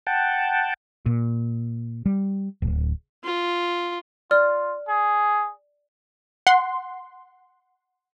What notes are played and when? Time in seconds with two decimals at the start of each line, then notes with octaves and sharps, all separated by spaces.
0.07 F#5 G5 A5
1.06 A#2
2.06 G3
2.62 D1
3.24 F4
4.31 F4 D5 F6
4.89 G#4
6.47 F#5 C6